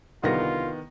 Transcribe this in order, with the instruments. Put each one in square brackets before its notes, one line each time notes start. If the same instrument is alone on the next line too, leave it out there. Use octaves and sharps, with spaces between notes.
[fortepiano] C2 D3 G3 [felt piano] D#3 B3 A#6 [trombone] F4